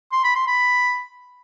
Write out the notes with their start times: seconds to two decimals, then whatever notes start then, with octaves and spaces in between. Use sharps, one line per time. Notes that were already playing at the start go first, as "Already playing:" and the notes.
0.12 C6
0.24 B5
0.35 C6
0.47 B5